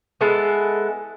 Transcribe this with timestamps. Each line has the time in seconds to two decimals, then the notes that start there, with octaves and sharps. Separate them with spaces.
0.21 G#3 B3 E4 A4